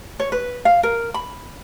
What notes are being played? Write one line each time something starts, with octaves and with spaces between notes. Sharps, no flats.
C#5
B4
F5
A#4
B5